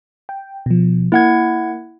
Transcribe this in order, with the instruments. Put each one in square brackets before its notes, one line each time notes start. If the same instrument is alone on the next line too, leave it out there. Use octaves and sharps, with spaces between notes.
[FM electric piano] G5
B2 F3
[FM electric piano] A#3 [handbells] E4 F#5 G#6